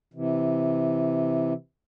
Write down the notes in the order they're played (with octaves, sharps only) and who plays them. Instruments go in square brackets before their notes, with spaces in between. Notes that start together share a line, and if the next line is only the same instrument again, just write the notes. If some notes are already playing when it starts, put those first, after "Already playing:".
[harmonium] C3 E3